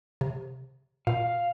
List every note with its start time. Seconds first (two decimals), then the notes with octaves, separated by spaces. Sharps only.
0.21 C3
1.07 A#2 F5